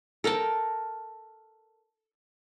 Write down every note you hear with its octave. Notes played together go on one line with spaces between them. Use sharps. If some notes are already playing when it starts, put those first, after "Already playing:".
A4 A#4 G5 A5